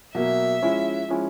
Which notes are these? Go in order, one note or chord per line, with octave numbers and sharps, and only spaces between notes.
B2 F#3 A#3 E5
F3 G#3 C#4 E4
F3 G#3 C#4 E4